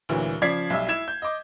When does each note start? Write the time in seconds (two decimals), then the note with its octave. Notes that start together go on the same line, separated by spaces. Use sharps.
0.09 D2 A#2 E3 F#3
0.41 C#3 F3 D5 G#6 B6 C7
0.70 B1 G3 E5
0.88 E4 G#6 E7
1.08 G6
1.22 D#5 D6